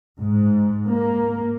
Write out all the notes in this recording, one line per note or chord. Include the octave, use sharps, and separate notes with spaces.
G#2
A#3